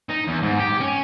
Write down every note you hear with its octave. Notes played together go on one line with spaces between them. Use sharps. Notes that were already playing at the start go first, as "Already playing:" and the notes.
D#4
E2
G#2
G4
C#4